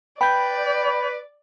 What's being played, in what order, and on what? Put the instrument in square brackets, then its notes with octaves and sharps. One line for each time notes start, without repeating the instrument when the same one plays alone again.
[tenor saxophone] B4 [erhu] D5 [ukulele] G5 [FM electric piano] B5 G6